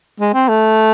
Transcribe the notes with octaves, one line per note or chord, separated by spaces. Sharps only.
G#3
C4
A3